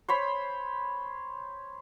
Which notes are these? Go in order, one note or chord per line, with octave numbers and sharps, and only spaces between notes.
C5 C#5 B5